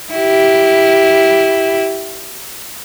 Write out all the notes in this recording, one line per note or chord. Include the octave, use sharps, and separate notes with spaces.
E4 G4